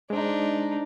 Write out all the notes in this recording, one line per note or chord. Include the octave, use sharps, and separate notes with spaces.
G#3 D4 D#4 C5